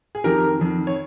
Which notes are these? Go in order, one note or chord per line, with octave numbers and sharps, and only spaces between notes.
G#4
F2 D#3 G4 A#4
F2 D#3
C#5